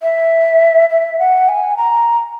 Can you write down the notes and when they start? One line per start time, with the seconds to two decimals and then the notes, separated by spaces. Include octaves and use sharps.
0.02 E5
0.90 E5
1.19 F#5
1.49 G#5
1.77 A#5